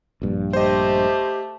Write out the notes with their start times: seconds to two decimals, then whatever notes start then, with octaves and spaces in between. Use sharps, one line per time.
0.22 A#1 G2
0.53 A3 G4 C5 D#5